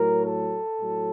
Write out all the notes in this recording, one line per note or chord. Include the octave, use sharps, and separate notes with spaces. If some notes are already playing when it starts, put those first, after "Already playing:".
Already playing: A2 F#3 A#4
A4
A2 F#3